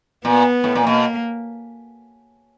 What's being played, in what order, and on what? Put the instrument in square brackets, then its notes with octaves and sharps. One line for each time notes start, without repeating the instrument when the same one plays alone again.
[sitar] A#2 [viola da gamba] B3
[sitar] A2
A#2
[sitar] B2 [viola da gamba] A#3